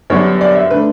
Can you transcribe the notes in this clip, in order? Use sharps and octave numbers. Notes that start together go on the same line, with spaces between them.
F#2 D3 G3 B3 D4 C#5
D5
E5
D3 A3 D4 B4